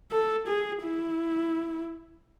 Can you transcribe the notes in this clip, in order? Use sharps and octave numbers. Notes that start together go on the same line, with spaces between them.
A4
G#4
E4